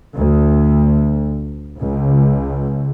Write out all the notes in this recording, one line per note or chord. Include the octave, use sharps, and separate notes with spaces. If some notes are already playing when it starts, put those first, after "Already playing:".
D2
C#2